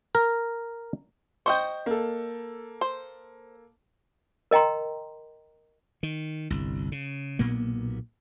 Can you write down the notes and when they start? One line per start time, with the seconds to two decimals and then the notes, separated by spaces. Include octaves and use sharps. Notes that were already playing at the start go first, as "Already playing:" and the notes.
0.15 A#4
1.46 C5 D#5 G5 C#6 G6
1.86 A#3 A4
2.81 C5
4.51 A#4 D#5 G5 A#5 C6
6.03 D#3
6.50 G1 C2
6.92 C#3
7.39 B1 A#2 A#3 B3